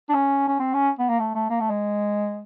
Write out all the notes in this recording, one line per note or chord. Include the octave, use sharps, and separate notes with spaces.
D4
C#4
C#4
C4
C#4
B3
A#3
A3
A3
A#3
A3
G#3